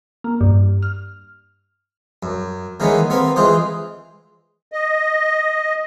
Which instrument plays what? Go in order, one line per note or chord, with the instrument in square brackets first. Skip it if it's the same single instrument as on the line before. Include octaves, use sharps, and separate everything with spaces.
[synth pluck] A#3
G2
F6
[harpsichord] F#2
D#3 E3 G#3 A#3 B3 C#4
B3 C4 A#4 F5
E3 G#3 F4 C5 D#6
[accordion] D#5